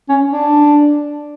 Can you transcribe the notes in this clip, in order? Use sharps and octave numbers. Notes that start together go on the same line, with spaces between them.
C#4
D4